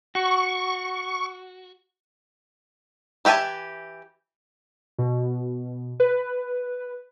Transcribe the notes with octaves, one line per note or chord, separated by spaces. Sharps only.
F#4 C#6
E3 G4 E5 G#5 A5
B2
B4